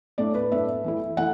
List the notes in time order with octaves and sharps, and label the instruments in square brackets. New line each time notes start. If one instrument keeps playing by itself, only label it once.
[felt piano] A2 A3 D4 D5
B4
A2 A3 D4 E5
E3 A3 E4
E3 A3 E4 F#5